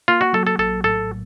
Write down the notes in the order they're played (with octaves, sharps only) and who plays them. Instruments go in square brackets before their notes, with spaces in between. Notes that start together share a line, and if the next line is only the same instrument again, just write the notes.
[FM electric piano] A#3 [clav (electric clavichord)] F4
[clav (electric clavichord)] F#4
[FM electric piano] F#3 [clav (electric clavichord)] A4
[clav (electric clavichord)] A4
[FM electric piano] A#1 [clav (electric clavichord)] A4
[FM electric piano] A2 [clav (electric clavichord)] A4